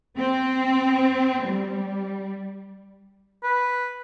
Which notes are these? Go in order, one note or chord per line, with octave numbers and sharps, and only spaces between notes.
C4
G3
B4